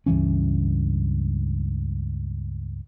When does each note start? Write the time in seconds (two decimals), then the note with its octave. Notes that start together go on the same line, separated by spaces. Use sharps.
0.06 C#2 G2 E3 C#4